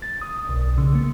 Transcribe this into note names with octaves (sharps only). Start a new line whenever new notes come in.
A6
D#6
B1
C#3
A#3